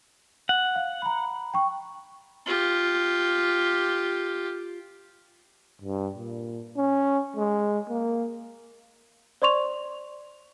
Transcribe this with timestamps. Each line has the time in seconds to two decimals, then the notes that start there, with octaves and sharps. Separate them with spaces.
0.49 F#5
0.75 F5
1.02 A#5 B5
1.54 G5 C#6
2.46 F4 G4
5.81 G2
6.15 A#2
6.77 C#4
7.37 G#3
7.89 A#3
9.42 C5 D5 C6 C#6 F7